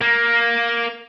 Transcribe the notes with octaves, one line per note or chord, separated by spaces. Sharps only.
A#3